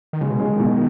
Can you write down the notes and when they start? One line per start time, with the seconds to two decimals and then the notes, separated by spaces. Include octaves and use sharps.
0.13 D#3
0.21 C#3 G#3
0.31 B2
0.40 C#3 G#3
0.49 D#3
0.60 B2